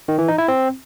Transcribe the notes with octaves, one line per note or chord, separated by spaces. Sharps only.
D#3
E3
D#4
E4
C4